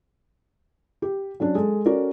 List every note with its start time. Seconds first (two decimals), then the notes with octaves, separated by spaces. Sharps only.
1.02 G4
1.40 F#3 C#4 D4
1.55 G#3 A4
1.86 C#4 F#4 A4 A#4 D5